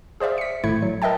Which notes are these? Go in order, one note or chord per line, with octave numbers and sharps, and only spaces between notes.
G#4 C5 D5 E5 F5
B6 C#7
G#1 A2 A3 E4 G#6 C#7
F#3
A#4 D#5 E5 G5 A5